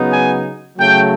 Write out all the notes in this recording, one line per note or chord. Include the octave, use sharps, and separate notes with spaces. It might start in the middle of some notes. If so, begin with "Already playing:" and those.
Already playing: C#3 F#3 B3 D#4
G#5
C#3 F#3 A3 G5